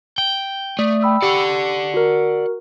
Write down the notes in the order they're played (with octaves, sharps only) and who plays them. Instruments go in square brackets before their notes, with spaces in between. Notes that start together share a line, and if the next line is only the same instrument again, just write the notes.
[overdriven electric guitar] G5
[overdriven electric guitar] A3 [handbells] D5 D#6
[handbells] G5 B5 E6
[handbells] G4 C#6 [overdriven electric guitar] D5 F#5
[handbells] F#4 A#4